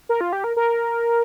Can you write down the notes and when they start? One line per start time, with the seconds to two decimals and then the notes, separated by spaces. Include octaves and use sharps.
0.09 A#4
0.21 F4
0.33 G4
0.44 A#4
0.56 A#4